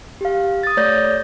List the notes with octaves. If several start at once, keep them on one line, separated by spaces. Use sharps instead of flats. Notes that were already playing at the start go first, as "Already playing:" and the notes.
G4 F5
D#6 A6
A3 C#5 D5 G6 A#6